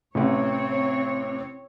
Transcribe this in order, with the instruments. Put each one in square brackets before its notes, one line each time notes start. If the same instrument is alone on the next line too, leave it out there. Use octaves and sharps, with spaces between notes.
[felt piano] A1 C3 [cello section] C4 C#5